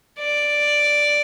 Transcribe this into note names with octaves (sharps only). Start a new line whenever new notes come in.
D5